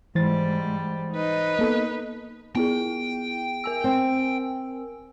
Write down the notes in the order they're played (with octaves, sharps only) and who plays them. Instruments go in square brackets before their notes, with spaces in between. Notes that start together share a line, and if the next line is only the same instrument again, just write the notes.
[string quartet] G#2 G3 [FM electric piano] E3 C5 A6
[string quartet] D#4 B4 D#5
[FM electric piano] A#3 B3 A4
[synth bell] B3 E4 G#4 [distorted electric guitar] G5
[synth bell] A#4 G#5 E6
[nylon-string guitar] C4